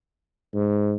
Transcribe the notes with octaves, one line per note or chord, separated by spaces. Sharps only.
G#2